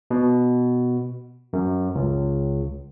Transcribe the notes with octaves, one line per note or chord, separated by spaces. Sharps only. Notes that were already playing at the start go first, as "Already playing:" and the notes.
B2
F#2
C#2